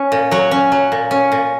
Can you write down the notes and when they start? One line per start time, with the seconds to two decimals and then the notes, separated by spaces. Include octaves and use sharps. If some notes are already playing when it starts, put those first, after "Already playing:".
Already playing: C#4
0.12 A#2
0.31 F#3 C#5
0.51 C#4
0.72 F#3
0.92 A#2
1.11 C#4
1.32 A#2